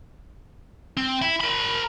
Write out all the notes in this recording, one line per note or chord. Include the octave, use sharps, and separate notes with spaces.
C4
E4
A#4 B5